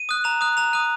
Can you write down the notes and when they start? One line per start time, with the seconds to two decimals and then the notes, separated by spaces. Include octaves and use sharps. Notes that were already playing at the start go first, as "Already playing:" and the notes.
Already playing: D#7
0.09 D#6 F#6
0.24 A#5 F7
0.41 D#6 F#6
0.57 A#5 F7
0.73 D#6 F#6 D#7